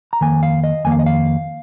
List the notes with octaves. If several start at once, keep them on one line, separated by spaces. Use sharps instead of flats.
A#5
F2 D#3 A#3 G#5
F5
D#5
F2 D#3 A#3 G#5
F5
D#5
F5